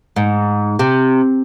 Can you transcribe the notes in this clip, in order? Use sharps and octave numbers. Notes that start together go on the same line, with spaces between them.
G#2
C3